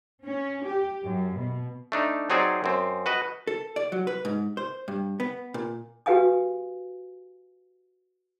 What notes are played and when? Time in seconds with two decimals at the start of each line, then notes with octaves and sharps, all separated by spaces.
0.25 C#4
0.66 G4
1.04 F#2
1.37 B2
1.92 A3 D4 D#4
2.30 F#3 C4 D#4 G#4 C5 D5
2.64 F#2 C4
3.06 F#4 B4 D#5
3.47 A4
3.76 D5
3.92 F#3
4.07 B4
4.25 G#2
4.57 C5
4.88 G2
5.20 B3
5.54 A#2
6.06 F#4 G4 B4 F5 G#5 D#6